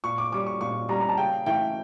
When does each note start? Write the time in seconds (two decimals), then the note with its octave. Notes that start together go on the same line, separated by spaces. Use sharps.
0.04 A#2 C#6
0.18 D6
0.32 G3 C#4 D6
0.46 C#6
0.61 A#2 C#6
0.89 G3 A#5
0.92 C#4
1.01 A#5
1.09 A5
1.17 C#3 G5
1.46 E3 A3 C#4 G5